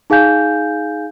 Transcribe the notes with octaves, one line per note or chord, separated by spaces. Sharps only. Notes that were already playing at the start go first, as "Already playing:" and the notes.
D#4 G#4 F5 G#5 G6